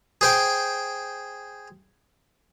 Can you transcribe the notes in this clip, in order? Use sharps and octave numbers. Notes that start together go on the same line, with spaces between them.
G#4 C5 G5